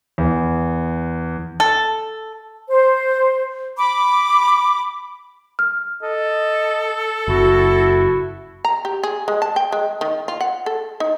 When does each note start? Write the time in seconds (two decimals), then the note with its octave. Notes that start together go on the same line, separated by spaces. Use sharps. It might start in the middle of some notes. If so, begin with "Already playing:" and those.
0.18 E2
1.60 A4
2.69 C5
3.77 B5 D6
5.59 F6
6.02 A4 D#5
7.28 F#1 E4 F#4
8.65 A#5
8.85 G4
9.03 G#4
9.28 G#3
9.42 A5
9.56 G5
9.72 G#3
10.01 D#3
10.28 F4
10.41 F#5
10.66 A4
11.00 D#4